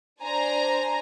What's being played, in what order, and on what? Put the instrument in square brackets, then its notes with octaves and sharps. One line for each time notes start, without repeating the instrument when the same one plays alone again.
[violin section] D4 C5 G#5 A#5